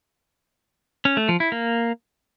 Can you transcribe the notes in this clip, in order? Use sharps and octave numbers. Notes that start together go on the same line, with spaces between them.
C#4
A3
F3
E4
A#3